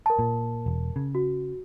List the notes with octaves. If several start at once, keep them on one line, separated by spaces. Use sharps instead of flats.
A#4 A5
A#2
E1
C#3
F#4